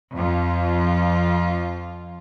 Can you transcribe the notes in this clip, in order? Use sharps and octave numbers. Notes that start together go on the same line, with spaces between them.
F2 F4